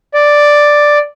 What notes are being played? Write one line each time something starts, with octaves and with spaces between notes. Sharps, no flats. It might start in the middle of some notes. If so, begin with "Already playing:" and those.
D5